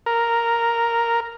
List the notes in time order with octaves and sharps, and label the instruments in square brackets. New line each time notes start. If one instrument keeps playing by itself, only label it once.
[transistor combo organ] A#4